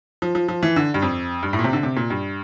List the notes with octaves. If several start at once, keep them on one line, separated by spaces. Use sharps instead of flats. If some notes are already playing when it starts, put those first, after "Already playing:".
F3
F3
F3
E3
D3
G2
F2
G2
A2
A#2
C3
D3
C3
A#2
G2